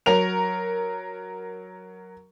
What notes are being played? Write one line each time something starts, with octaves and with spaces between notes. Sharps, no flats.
F#3 A#4 F7